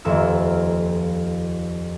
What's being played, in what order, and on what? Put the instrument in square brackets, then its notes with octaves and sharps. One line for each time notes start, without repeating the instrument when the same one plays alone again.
[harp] D#1 F2 A#3 E5